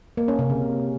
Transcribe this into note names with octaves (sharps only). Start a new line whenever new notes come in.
A#3
C#4
C3
C#3